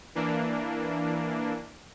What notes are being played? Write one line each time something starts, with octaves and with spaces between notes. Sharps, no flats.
E3 A#3 D4